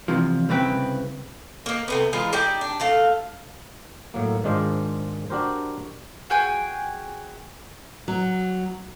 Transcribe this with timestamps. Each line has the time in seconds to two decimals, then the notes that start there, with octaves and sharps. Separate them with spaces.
0.08 E2 C3 F3
0.49 C2 C#3 C4 B4 G5
1.66 A#3 D#4
1.88 C3 A3 B3
2.13 E3 G#3 D#4 F4
2.33 D#4 G4 D5 G5
2.61 D4
2.80 A3 A4 F5
4.14 A2 F#3 A#3
4.44 G#2 D#3 G#3 D4 F4 C5
5.30 D4 F#4 G4 A#4 C5
6.30 F#4 G#4 G5 G#5
8.08 F#3